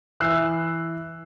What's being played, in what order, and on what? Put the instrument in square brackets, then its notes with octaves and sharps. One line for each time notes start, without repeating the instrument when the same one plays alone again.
[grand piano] E3 E6 F#6 C7